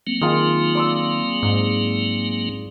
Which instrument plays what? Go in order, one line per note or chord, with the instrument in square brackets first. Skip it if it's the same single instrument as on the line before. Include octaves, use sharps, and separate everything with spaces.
[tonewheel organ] F#3 A#3 C4
[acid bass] D#3 [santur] F4 G#4
[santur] D5 C6 E6
[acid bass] G#2